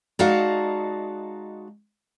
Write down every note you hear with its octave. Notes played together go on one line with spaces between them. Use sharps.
G#3 D#4 F#4 D5 F5 A5